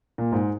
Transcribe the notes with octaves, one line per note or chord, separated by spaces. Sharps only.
A#2
G#2